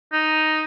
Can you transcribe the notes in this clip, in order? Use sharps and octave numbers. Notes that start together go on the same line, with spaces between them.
D#4